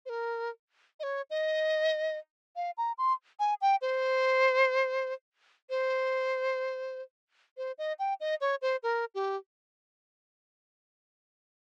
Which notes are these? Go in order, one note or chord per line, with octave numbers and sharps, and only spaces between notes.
C5
A#4
D#5
C#5
D#5
F5
A#5
C6
G#5
G5
C5
C5
C5
D#5
G5
D#5
C#5
C5
A#4
G4